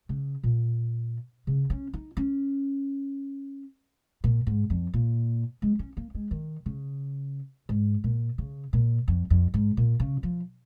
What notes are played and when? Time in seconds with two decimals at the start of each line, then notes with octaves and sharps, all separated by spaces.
0.09 C#3
0.43 A#2
1.47 C#3
1.70 C#4
1.93 D#4
2.17 C#4
4.24 A#2
4.47 G#2
4.70 F2
4.94 A#2
5.62 G#3
5.79 C#4
5.97 A#3
6.15 G#3
6.31 D#3
6.66 C#3
7.69 G#2
8.04 A#2
8.38 C#3
8.73 A#2
9.08 F2
9.30 F2
9.54 G#2
9.77 A#2
10.00 C#3
10.23 F3